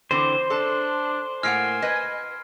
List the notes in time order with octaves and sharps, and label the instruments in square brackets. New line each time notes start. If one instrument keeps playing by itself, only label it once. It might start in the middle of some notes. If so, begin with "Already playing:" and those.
[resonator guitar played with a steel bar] D3 E3 C4 [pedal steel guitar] C5
[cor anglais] D4 [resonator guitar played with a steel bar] A4 A5 [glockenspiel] C6
[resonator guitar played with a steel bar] A2 A#3 F#5 [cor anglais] G#5 [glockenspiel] F6 C7 D7
[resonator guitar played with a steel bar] B4 D#5